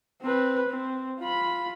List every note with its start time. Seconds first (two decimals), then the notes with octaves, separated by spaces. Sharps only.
0.22 C4 B4
0.68 C4
1.20 F4 B5